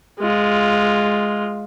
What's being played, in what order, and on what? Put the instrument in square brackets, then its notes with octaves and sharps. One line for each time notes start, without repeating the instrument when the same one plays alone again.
[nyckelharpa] G#3 F4